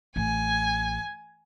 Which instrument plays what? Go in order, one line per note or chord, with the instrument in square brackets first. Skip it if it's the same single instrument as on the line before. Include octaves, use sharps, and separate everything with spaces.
[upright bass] A1 [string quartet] G#5